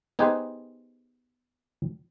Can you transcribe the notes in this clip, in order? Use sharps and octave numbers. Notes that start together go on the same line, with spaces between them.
B3 D#4 G4 G#4 B4 C5